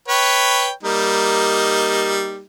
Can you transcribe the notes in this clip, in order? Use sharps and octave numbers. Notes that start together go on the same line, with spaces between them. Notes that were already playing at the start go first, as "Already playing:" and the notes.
B4 C#5 G5
G3 A#3 D#4